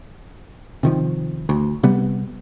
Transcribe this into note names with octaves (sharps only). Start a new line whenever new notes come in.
C3 D#3 F3
D2
C3 G3 B3